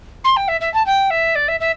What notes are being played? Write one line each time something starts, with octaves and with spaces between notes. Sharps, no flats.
C6
G5
E5
E5
A5
G5
E5
D5
E5
E5